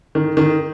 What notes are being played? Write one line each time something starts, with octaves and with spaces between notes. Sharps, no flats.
D#3
D#3